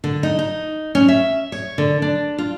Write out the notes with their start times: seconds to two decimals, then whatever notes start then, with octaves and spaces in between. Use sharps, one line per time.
0.04 D3
0.23 D#4
0.39 D#4
0.95 C#4
1.08 E5
1.52 C#5
1.78 D3
2.02 D4
2.38 F4